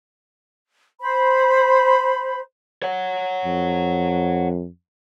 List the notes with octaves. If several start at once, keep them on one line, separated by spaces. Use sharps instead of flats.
C5 B5
C#5 F#5
F2